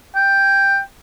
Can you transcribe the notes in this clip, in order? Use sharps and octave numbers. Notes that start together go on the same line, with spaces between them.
G5